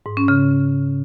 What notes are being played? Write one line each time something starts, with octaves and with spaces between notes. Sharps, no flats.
G#2
C#4
C#3